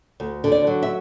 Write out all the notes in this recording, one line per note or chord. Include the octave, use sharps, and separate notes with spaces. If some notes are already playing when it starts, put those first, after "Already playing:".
D2
D3
D5
F#3
E5